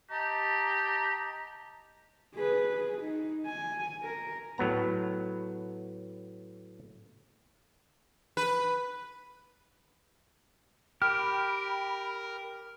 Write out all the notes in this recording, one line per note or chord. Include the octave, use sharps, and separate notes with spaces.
G4 D#5 A5 A#5
G#4 B4
G#4
D#4
G#5
A#4
A2 F#3 B3 A#5
B4
G4 A#4 B5 F6